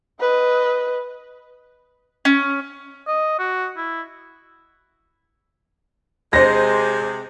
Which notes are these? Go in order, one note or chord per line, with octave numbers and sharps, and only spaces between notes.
B4 D#5
C#4
D#5
F#4
E4
C3 G#3 C5 A#6